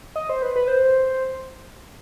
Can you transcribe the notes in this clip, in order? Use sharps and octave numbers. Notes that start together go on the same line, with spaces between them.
D#5
C5
B4
B4
C5